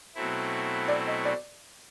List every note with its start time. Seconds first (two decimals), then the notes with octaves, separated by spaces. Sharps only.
0.15 B2 F#3 A3 C4 E4
0.88 D5
1.07 D#5
1.25 D5